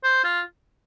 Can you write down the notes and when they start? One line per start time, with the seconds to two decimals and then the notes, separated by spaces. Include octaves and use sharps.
0.04 C5
0.24 F4